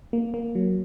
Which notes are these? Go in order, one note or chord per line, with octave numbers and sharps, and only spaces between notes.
A#3
A#3
F#3